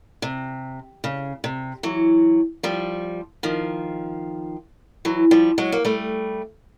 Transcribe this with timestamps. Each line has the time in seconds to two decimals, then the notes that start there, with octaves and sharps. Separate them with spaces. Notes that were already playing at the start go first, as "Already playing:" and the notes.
0.22 C3
1.04 C#3
1.44 C3
1.83 E3 F#3
2.63 F3 G3
3.43 D#3 F3
5.05 E3 F#3
5.31 F3 G3
5.58 F#3 G#3
5.72 A#3
5.85 G3 A3